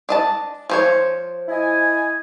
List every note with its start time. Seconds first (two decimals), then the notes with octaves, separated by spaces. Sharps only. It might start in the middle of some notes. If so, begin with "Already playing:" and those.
0.09 D4 D#5 A5
0.70 F3 C5 C#5
1.48 E4 D#5 G#5